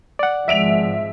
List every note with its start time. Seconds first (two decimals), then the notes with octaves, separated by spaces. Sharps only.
0.19 D5 F#5
0.48 G#1 F3 G#3 E5 D7 F7